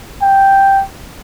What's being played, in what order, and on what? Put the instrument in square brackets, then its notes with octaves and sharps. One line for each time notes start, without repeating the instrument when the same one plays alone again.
[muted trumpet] G5